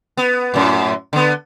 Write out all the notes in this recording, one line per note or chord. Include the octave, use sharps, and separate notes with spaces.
B3
F#2 A2
D3 B3